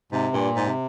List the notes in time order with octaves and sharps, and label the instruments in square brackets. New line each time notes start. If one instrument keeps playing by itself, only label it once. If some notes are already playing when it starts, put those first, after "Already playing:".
[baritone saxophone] G#2 [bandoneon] C3
[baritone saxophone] G2 [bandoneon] A#2
[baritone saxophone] G#2
[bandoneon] C3